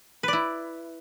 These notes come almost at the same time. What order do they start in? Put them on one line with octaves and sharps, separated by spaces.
B4 D5 E4